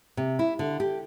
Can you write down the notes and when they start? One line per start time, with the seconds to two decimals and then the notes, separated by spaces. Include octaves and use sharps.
0.17 C3
0.39 E4
0.59 D3
0.80 G4